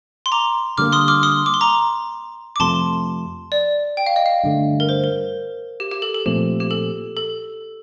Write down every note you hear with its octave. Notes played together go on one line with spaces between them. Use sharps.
C6
A#5 D6
D3 G3 A#3 D6 F6
C6 D#6
D6 F6
C6 D#6
D6
C6
A#5 D6
D6
F2 C3 F3 A3 A5 C6
D5
G5
F5
D#5
F5
G2 D3 A3
A#4
C5
A#4
G4
G4
A4
A4
A#2 F3 A3 C4 G4
G4
A4
A4